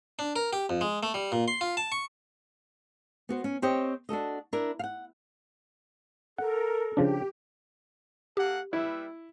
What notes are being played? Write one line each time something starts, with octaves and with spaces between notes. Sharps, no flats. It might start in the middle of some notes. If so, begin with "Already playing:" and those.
D4
A#4
G4
F2
G#3
A3
G3
A#2
C6
F4
A5
C#6
B3 F#4 C5
C#4
C4 G4 C5 C#5 D#5
D4 F#4 A4 D#5
D4 E4 A#4
F5 F#5
A4 A#4 F#5
C#3 F3 D4 G4
A#3 G4 A4 F#5
G3 E4 B4 E5